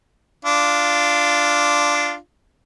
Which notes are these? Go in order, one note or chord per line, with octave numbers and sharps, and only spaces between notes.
D4 F4